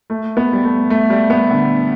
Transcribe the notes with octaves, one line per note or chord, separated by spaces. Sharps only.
A3
B3
G3
A3
A3
G3
B3
D3